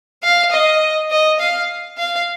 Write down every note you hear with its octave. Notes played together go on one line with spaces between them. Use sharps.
F5
D#5
D#5
F5
F5